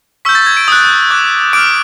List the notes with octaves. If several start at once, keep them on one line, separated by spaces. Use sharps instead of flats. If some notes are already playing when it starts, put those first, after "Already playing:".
C#6 E6 G6 B6
A6
G#6
D7
D#6 F#6
D6 F#6
D6 F6 D7